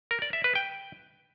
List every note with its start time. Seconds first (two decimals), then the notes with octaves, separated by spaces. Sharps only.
0.11 A#4
0.22 D5
0.33 E5
0.44 B4
0.55 G5